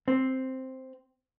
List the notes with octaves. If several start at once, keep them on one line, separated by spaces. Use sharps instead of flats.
C4